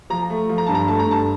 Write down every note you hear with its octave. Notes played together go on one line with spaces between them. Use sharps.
F3 A#5
A3
F3
A#5
G2 A5
A#5
A3 A5
A#5
G2 A5